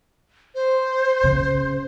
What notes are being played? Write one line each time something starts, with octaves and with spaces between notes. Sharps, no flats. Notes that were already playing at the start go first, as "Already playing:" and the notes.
C5
C#3